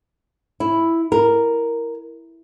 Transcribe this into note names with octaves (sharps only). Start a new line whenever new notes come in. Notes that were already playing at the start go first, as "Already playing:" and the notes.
E4
A#4